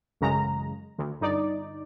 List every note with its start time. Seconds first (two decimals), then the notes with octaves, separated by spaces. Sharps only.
0.21 A1 F#2 C#3 G#3 A#5
0.98 D2
1.21 G1 D#4 D5